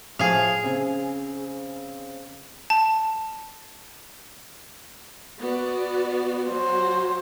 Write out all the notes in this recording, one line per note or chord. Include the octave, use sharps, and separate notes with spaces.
A2 F3 G#4 F5
C#3 C4
A5
B3 F#4 D5
F#3 F#4 C5